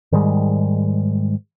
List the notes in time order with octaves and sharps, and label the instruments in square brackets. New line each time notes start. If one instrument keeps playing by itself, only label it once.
[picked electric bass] G#2 D#3 G3 G#3